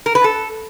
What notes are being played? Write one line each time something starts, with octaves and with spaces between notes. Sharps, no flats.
A#4
B4
A4